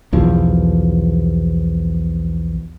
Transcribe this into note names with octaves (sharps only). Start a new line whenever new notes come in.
B1 E2 F3